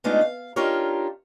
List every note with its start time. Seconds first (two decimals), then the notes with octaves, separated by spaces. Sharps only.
0.04 G#3 A3 B3 D4 D#4 F4
0.21 F5
0.56 D4 D#4 F4 G4 A#4 C#5